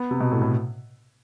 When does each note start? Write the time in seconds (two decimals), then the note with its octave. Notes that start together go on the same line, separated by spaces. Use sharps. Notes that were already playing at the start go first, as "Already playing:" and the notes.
Already playing: B3
0.11 C3
0.20 B2
0.31 A2
0.42 A2